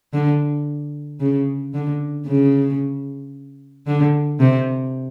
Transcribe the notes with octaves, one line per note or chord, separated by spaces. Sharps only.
D3
C#3
D3
C#3
D3
C3